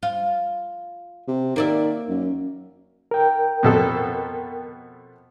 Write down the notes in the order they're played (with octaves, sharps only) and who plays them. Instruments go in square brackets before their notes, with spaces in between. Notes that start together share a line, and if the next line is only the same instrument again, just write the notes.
[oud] F4
[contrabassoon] C3
[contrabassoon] D#3 [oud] A#3 D5 E5
[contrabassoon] F#2
[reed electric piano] A#4 G5
[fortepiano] F2 B2 A4